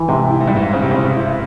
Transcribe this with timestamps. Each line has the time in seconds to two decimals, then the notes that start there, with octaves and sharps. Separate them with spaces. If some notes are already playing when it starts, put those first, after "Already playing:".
Already playing: E3
0.08 G#2 C3
0.30 E4
0.40 G#2
0.47 G2
0.52 G#2 E4
0.73 C#3 C4
0.83 C3
0.91 C#3 C4
1.05 C#3
1.16 E4